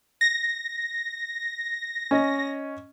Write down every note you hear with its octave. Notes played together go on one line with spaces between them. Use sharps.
A#6
C#4 D#5